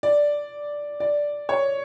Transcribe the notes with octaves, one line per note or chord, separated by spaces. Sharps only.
D5
D5
C#5